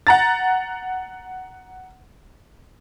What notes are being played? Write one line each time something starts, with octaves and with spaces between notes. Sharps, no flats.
F#5 A#5 A6